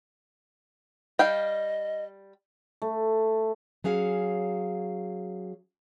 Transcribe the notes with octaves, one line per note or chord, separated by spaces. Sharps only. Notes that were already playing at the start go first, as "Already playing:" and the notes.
G3 D#5 F5 G5
A3
F#3 C#4 G#4 F5